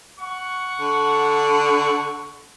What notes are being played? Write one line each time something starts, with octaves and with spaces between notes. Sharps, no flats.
F#5 C#6
D3